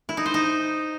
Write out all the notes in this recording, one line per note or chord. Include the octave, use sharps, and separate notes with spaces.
E4
D#4
C5
D#4